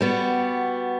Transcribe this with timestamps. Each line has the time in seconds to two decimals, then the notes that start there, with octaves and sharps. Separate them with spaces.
0.01 G3 B3 F#4